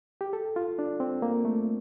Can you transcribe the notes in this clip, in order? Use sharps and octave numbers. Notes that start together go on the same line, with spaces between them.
G4
A4
F4
D4
C4
A#3
A3